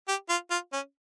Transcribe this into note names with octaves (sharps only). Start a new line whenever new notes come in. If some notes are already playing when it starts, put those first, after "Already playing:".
G4
F4
F4
C#4